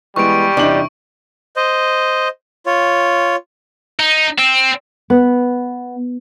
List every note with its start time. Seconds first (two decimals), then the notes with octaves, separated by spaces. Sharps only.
0.16 E3 G3 G#3 B3 C#6 D7
0.57 E2 C3 D4 D#4 F#7
1.56 C5 D#5
2.66 F4 C#5
4.00 D#4
4.38 C4
5.10 B3